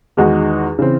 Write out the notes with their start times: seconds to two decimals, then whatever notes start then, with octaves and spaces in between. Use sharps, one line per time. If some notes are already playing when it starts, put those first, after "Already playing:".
0.17 E2 D#3 G#3 D#4 F#4
0.79 C#3 E3 C4